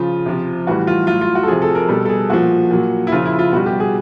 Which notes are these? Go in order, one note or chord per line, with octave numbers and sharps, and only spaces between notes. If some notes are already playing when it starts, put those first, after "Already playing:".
Already playing: C#3 F3 F4
C3 F3
A2 E3 G3 F#4
F4
A2 F#3 F4
F4
F#4
A4
C3 F3 G#4
A4
A#4
B2 G3 A4
A4
G#4
A#2 F3 F#4
A#2 F#3
E4
C#3 F3 F4
E4
F4
B2 G3 F#4
G4
G#4